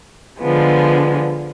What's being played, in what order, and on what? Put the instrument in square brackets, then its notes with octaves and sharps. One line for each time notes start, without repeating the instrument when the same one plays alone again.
[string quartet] D3 F3 G#3 B3